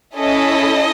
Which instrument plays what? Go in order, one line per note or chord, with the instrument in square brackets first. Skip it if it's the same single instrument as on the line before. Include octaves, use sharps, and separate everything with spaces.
[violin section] C#4 E4 A4 D#5